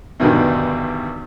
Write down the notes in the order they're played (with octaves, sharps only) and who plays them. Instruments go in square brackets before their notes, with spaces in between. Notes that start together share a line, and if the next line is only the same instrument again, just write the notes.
[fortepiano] E2 G2 B2 D3 D#3 G3